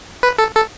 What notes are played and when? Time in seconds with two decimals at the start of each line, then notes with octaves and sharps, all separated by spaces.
0.23 B4
0.39 A4
0.55 A4